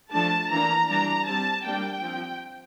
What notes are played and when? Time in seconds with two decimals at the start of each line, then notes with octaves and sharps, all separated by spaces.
0.12 F3 A3 D4 A5
0.50 E3 A#3 D4 A#5
0.89 E3 G3 D4 A#5
1.26 G3 C4 A5
1.65 G3 A#3 D4 G5
2.03 F3 C4